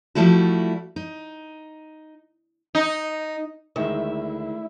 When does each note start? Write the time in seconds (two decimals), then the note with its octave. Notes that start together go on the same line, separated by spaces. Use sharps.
0.15 F3 G3 A3 E4 F#4
0.96 D#4
2.75 D#4
3.76 D2 D#3 G#3 E4 E5